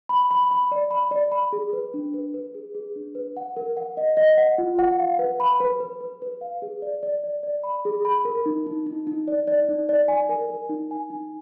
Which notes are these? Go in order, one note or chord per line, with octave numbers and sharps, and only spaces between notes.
B5
B5
B5
D5
B5
D5
B5
G#4
B4
D4
B4
B4
G#4
G#4
D4
B4
F#5
A#4
F#5
D#5
D#5
F#5
F4
F#5
F5
B4
B5
B4
B4
B4
B4
F5
G#4
D5
D5
D5
D5
B5
G#4
B5
A#4
D#4
D#4
D#4
D#4
D5
D5
D#4
D5
G#5
A#4
A#4
D#4
G#5
D#4